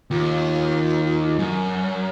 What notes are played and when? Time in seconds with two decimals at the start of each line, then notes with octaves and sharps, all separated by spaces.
0.11 D#2 F4
1.39 F#2